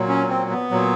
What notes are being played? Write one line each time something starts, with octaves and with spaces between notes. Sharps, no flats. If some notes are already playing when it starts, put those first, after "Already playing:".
Already playing: A#2 F#3
C#4
C4
B3
A#2 F#3